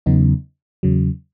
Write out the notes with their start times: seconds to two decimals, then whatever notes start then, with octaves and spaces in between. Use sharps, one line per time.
0.06 E2 C#3 F#3 B3 D#4
0.83 E2 C#3 F#3